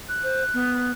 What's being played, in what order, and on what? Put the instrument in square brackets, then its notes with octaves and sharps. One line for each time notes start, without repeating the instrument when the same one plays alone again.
[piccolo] F#6
[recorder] C5
B3